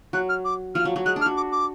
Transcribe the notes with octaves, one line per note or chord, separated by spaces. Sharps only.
F#3 F#6
F6
D6
F3 F6
F#3
F#3
G#3 F#6
D4
F6
F#4
D6
D6